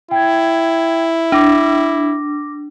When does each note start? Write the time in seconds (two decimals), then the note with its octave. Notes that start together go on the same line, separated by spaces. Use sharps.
0.11 E4 G5 G#6
1.32 D4 D6 A#6